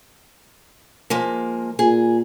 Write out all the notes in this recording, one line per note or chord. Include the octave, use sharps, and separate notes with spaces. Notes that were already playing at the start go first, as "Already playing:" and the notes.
F3 G#3 A#3
A#2 G#4